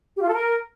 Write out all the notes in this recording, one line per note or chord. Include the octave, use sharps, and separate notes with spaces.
G4
F4
A4
A#4